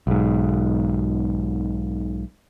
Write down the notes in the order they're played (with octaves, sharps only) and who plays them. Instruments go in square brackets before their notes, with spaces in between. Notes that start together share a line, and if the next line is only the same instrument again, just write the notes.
[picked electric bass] B1 G#2